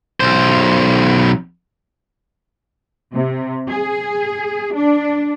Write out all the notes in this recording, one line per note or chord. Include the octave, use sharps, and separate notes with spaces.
B1 C5
C3
G#4
D4